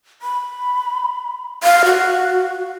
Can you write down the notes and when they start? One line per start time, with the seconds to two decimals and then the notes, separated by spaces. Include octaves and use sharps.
0.22 B5
1.63 F5
1.85 F#4